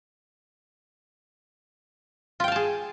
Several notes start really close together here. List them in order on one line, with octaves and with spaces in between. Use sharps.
F4 G5 F5 A5 G#4